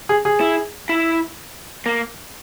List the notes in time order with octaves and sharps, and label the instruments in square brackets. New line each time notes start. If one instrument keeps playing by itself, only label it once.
[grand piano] G#4
G#4
[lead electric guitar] E4
E4
A#3